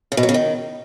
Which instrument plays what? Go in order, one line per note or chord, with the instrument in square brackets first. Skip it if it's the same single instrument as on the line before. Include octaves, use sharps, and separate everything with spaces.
[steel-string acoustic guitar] C#3
B2
F#3
C#3
D#3